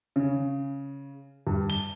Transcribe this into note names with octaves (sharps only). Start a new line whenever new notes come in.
C#3
G2
G7